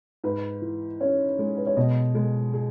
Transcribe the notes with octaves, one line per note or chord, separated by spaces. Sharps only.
G#2 B4
E3
C#4 C#5
G#3
B4
C#5
B2 D#5
G#3
G#4